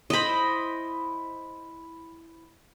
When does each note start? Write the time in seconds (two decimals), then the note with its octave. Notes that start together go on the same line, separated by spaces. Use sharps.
0.10 E4 C5 D#5 B5